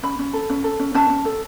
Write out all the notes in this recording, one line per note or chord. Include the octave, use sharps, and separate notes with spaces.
C#4 B5
C#4
A4
C#4
A4
C#4
C#4 A5
C#4
A4